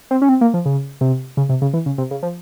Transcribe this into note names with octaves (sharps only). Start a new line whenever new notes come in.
C4
C#4
C4
A#3
F3
C#3
C3
C#3
C3
C#3
E3
C#3
C3
C#3
F3